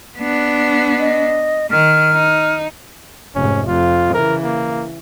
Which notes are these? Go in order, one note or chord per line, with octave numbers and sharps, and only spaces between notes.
B3 D4
D#5
D#3 F6
D#4
F1 G#2 C#4
F2 F4
C#3 E3 A#4
A#3